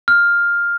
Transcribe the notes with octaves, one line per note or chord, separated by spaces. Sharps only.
F6